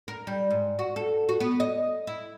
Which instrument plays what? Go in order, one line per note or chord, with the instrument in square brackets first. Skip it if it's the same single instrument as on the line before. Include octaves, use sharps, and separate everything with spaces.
[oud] A#4
G3
G#2
F#4
A4
F#4
B3
D#5
E4